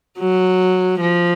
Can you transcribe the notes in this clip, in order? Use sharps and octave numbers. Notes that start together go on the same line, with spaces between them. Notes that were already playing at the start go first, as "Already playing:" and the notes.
F#3
F3